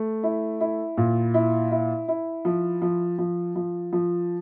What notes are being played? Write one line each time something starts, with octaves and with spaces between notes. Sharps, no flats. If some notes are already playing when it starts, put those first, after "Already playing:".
Already playing: A3
E4
E4
A#2
E4
E4
E4
F3
F3
F3
F3
F3